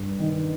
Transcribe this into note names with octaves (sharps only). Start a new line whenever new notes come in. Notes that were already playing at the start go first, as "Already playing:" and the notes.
Already playing: G2
D#3